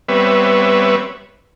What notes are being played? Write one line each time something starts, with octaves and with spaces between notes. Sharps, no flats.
G3 B3 C4 B4 C#5 E5